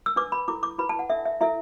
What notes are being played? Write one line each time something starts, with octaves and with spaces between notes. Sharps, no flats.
E6
D4 B4 D6
B5
E4 A4 D6
D6
E4 B4 B5
A5
F#5
D4 A4 E5
E5
E4 A4 E5